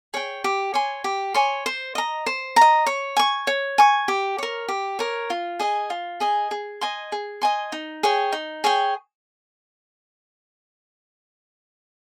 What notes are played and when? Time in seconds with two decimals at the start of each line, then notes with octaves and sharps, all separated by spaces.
0.14 G#4 C#5 G5
0.44 G4
0.74 C#5 G#5 C6
1.04 G4
1.34 C#5 G#5 C6
1.66 C5
1.95 D#5 A#5
2.26 C5
2.56 A#5
2.61 D#5
2.86 C#5
3.17 G#5 C#6
3.47 C#5
3.78 G#5 C#6
4.08 G4
4.38 A#4 C#5
4.68 G4
4.99 A#4 C#5
5.30 F4
5.59 G#4 D#5 G#5
5.90 F4
6.20 G#4 D#5 G#5
6.51 G#4
6.81 D#5 G#5 C6
7.12 G#4
7.42 D#5 G#5 C6
7.72 D#4
8.03 G#4 C#5 G5
8.32 D#4
8.64 G#4 C#5 G5